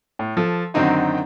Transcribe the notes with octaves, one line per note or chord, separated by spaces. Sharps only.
A2
F3 A4
F#2 D3 D#3 C4 D#4 F#4